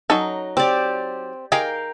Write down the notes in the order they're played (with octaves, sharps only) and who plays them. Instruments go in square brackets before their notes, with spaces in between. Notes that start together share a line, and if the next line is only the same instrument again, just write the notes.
[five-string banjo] F#3 D#4 [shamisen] C#4 A4
[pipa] C4 [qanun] G4 D5
[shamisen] D#3 G4 G#4 [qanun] A#4 F5 G5